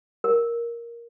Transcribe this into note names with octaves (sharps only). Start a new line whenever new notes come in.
A#4